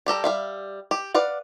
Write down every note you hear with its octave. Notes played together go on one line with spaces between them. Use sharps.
G3 G4 A4 A#5
G3 E5 F5
G4
B4 D5 F5 F#5